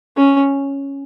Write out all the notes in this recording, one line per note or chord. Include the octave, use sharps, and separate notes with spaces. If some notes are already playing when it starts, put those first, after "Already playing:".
C#4